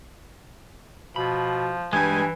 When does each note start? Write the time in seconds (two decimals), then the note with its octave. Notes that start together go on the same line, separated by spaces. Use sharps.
1.16 B2 F3 B5
1.93 G2 E3 G#3 G#4 G#5 G6